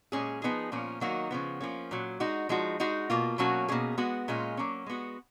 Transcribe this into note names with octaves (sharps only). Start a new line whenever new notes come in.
A#2 G#3 C#4 G#4
F3 B3 D#4 G#4
A#2 F3 A#3 C#4
D#3 F#3 A#3 D#4 F#4
C#3 F3 B3
F3 A#3 C#4
A#2 F#3 C#4
G#3 D#4 F#4
F3 G#3 D#4 F#4
G#3 D#4 F#4
B2 A#3 F4
B2 F#3 A#3 C#4 F#4
B2 A#3 C#4 G#4
G#3 B3 F#4
A#2 G#3 C#4 F4
F#3 A#3 C#4
G#3 B3 F#4